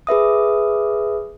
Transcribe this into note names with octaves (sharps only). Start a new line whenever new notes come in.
G#4 B4 E5 D#6